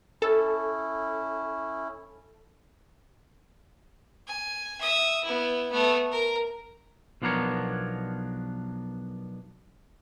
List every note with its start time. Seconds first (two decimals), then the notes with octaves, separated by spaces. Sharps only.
0.22 C#4 E4 A4
4.27 G#5
4.81 E5 D#6
5.24 B3 E4
5.71 A3 B3
6.11 A#4
7.22 B1 F3 B3 D4 A#4 C#5